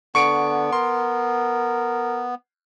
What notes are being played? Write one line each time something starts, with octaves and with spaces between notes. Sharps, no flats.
D3 B3 C#6 C#7 D7
A#4 C6